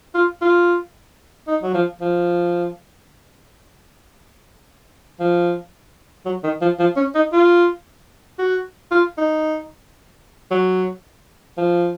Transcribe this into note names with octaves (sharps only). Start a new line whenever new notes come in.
F4
F4
D#4
F#3
F3
F3
F3
F#3
D#3
F3
F3
C#4
D#4
F4
F#4
F4
D#4
F#3
F3